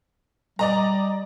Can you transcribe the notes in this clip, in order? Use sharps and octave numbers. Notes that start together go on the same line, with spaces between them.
G3 D5 D#5 A#5